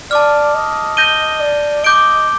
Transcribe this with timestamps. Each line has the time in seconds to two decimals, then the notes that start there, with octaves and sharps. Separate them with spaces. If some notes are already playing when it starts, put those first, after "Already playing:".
0.11 D5 A5 D6 F6
0.55 D#5
0.97 G6 A#6 D#7 G7
1.40 D5
1.83 D#5 D6 G6 D7 G7